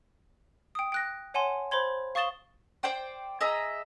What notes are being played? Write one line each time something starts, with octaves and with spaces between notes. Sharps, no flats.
G5 D#6
G5 F#6 A#6
C#5 F#5 G#5 A5 C6
C5 B5 C6 G#6
F5 C#6 D#6 A6 E7 G7
C5 D5 G5 C6
G#4 D#5 E5 A#5